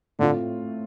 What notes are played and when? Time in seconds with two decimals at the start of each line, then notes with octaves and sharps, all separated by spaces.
0.19 A2 D3 A3 C4 F4